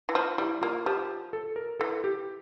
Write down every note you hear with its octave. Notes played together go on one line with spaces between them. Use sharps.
E3
F3
G3 E4
A#3 F4
F3 G4
A4
A#4
E3 A4
G4